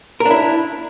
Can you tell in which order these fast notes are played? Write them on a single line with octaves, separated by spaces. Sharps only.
A#4 D4 E4